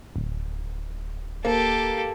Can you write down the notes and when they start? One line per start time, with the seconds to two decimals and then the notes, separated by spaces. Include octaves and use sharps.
0.16 D1
1.45 A#3 G4 A4